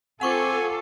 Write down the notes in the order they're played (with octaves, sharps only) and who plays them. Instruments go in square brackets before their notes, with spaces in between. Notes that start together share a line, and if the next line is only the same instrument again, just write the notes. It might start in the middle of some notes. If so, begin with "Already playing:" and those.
[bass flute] C4 [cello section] F4 A4 [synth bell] F#5 C#6 D6 [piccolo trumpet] G#5